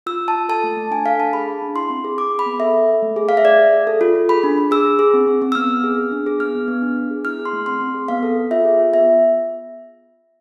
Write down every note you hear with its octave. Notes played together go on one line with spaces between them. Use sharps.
F4 E6
F4
A5
F4
A4 A5
A3
A3
D4 G#5
A4 F5
D4 A5
G#4 B5
G#4
D4
E4 C6
C4
G#4
G#4 D6
G#4
B5
B3
A4 E5
A4
A4
A3
G#4
A3 F5
E5
G#4 D5
G#4
G#4
A4
F4
A4
G#4 B5
D4
D4
G#4 E6
G#4
G#4
C4
C4
C4
E6
B3 F6
B3
G#4
G#4
D4
G#4
B3 F6
B3
B3
D4
D4
G#4
E4 F6
G#4
C6
A3
C4 C6
C4
G#4
B3 F5
A4
A4
F4 E5
G#4
F4
B3 E5